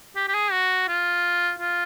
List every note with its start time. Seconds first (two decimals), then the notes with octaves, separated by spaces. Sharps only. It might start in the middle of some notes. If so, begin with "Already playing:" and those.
0.16 G4
0.28 G4
0.34 G#4
0.52 F#4
0.88 F4
1.59 F4